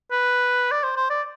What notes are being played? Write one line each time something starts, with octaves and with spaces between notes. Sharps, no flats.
B4
D5
C5
C5
D5